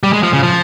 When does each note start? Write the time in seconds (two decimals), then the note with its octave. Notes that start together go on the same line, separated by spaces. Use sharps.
0.03 G3
0.13 G#3
0.23 F3
0.33 C#3
0.43 F3